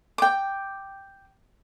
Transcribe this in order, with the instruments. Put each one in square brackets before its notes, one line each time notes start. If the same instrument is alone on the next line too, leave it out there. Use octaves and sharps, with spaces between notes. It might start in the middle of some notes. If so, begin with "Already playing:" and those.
[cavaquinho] G5 D6